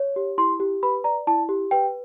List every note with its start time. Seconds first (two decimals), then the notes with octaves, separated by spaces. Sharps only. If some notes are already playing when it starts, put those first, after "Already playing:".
Already playing: C#5
0.16 G4
0.38 E4 C6
0.60 G4
0.83 B4 B5
1.04 D5 A#5
1.27 E4 A5
1.49 G4
1.71 B4 G5